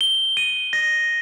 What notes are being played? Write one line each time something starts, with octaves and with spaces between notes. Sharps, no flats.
G7
D#7
A#6